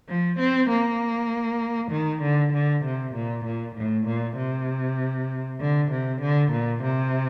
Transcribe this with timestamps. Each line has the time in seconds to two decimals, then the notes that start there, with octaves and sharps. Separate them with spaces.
0.08 F3
0.39 C4
0.69 A#3
1.91 D#3
2.22 D3
2.53 D3
2.84 C3
3.15 A#2
3.45 A#2
3.76 A2
4.07 A#2
4.37 C3
5.60 D3
5.91 C3
6.21 D3
6.51 A#2
6.83 C3